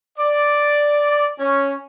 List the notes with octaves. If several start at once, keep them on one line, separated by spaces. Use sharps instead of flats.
D5
C#4